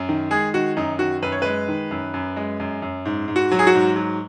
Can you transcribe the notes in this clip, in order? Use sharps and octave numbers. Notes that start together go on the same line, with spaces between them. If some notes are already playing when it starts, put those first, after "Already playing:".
Already playing: F#2
D#3
G#3 G#4
D#3 F#4
F#2 D#4
D#3 F#4
F#2 B4
C#5
G#3 B4
D#3
F#2
F#2
G#3
F#2
F#2
G#2
G#2
F#4
F#3
G#4
F#4
G#2
F#3